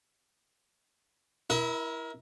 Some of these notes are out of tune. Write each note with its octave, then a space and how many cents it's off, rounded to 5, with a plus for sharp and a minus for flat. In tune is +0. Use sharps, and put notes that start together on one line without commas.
E4 +0 A#4 +25 E5 -45